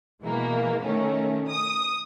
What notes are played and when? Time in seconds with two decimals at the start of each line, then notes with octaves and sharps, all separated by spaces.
0.22 B2 E3 G#3 A#3
0.82 D#3 A3 C#4
1.47 D#6